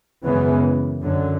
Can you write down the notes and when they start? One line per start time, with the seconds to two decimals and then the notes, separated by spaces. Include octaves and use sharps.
0.24 F#2 C#3 E3 G#3 B3
1.01 F#2 D3 F#3